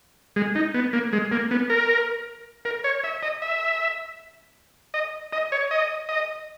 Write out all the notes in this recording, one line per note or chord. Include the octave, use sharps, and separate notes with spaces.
G#3
D#4
B3
A#3
G#3
A#3
B3
A#4
A#4
C#5
E5
D#5
E5
D#5
D#5
C#5
D#5
D#5